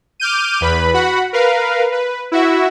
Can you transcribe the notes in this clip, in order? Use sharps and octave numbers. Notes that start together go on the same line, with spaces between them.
D6 F6 G6 D#7
E2 B4 B5
F#4 F#5 B5
A#4 B4 F5
B4
E4 F#4 E5